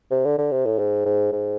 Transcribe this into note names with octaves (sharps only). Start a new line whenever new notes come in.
C3
D3
D3
C3
A2
G#2
G#2
G#2